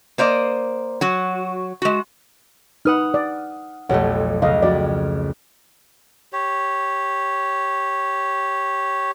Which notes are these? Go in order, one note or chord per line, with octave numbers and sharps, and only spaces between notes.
A#3 C5 D5 D#5
F#3 F#4
G#3 F#4
D#4 B4 F#5 D#6 F6
D5
B1 F2 A3 G4 C#5 F#5
C#2 D#5 F5
F2 F#4 D5
G4 C#5